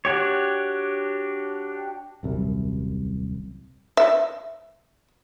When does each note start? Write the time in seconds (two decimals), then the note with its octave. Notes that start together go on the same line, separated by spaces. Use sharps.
0.05 D4 F#4 G4 C#5
2.23 D#1 C2 F#2
3.97 E5